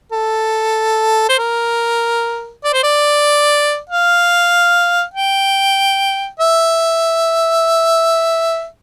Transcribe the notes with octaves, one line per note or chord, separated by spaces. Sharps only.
A4
C5
A#4
D5
C5
D5
F5
G5
E5